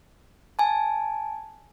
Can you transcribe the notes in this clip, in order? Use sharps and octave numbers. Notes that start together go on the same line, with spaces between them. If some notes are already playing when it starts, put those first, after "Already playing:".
G#5 A5